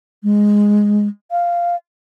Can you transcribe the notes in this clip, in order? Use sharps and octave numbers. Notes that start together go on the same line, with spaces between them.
G#3
F5